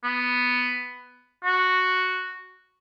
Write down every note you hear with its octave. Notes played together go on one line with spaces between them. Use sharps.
B3
F#4